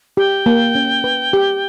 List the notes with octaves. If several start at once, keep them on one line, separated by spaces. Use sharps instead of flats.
G4 G5
A#3
C#4
B4
G4